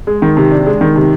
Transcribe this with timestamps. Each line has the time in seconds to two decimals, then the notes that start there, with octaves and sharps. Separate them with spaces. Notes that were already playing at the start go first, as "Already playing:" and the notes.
0.07 G#3
0.22 D#3
0.37 C3
0.52 D4
0.67 G#3
0.81 D#3
0.96 C3